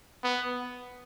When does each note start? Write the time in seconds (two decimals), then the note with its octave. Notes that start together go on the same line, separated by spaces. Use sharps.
0.24 B3